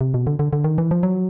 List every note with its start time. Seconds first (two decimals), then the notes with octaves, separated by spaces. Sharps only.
0.01 C3
0.14 B2
0.27 D3
0.39 D3
0.53 D3
0.64 D#3
0.78 E3
0.91 F3
1.03 F#3